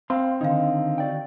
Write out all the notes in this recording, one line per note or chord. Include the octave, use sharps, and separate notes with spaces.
C4 F5 C6
D3 D#3 D#4 D#5 F5
F#4 D5 G5